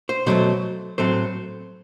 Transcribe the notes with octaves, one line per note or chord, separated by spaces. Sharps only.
C5
B2 F#3 A3 C5
A2 F#3 A3 C4 C5